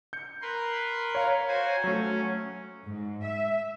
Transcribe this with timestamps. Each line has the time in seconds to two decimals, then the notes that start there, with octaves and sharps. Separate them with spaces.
0.13 G6 C#7
0.42 A#4 B4 C6
1.15 C#5 F5 A#5
1.48 F#4 C5 G#5
1.84 F#3 A3 C#4
2.86 G#2
3.24 E5